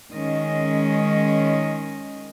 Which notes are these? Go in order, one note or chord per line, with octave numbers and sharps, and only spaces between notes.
D#3 G#3 C#4 D#5